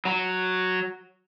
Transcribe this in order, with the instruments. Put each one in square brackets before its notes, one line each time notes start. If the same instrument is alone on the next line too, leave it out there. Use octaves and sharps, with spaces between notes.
[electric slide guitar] F#3